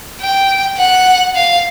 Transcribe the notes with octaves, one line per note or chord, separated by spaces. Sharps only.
G5
F#5
F5